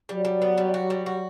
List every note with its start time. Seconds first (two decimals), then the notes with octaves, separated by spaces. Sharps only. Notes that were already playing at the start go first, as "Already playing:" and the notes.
0.09 F#3 G3
0.25 G3
0.42 B3
0.58 G3
0.74 F#4
0.90 G3
1.06 F#4